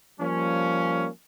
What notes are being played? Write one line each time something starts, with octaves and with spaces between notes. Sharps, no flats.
F3 G3 A#3 C#4